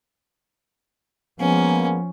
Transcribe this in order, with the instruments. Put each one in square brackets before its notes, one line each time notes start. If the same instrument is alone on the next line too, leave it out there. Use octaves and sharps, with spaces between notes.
[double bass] F3 [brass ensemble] G#3 A#3 B3 [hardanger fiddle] C#4